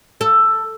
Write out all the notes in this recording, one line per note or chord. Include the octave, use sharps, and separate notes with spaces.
A4